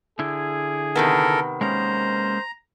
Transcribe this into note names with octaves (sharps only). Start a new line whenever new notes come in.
D3 E4 G#4
C3 D#3 B3 A4 A#4
G#3 A#3 C#4 C5 A#5